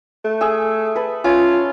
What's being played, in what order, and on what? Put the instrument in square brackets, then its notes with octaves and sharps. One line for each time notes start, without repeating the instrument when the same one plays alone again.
[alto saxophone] A3
[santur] G#4 E5
B4 A5
[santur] C#4 [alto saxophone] F4